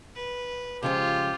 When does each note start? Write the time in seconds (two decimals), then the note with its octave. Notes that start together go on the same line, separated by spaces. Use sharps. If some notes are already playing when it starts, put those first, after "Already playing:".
0.15 B4
0.83 C#3 F3 G#3 F4 G4